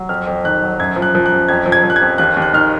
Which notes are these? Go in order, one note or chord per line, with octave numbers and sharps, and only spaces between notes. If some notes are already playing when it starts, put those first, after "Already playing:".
Already playing: F#3
F2 F6
F2
D#3 F#6
F#3
F#2 G#6
F3
F#6
F3
F#6
F#2
F2 G#6
F3
G#6
F3
F#6
G#6
F2
D#2 F#6
D#2
F#6
D#3 F6